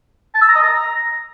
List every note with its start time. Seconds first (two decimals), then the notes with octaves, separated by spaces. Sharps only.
0.34 A5
0.41 E6
0.48 A#5
0.55 D#5
0.62 A#5